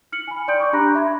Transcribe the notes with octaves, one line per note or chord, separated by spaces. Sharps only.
F6 C#7 F#7
G#5 B5
D5 G5 C6 D#6 G6 D7
C#6 D6
D4 G4 A#5 B5 F#6 A#6
E5 B5 C6 G#6